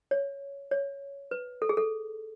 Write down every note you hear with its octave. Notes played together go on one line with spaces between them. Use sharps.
C#5
C#5
B4
A4
G#4
A4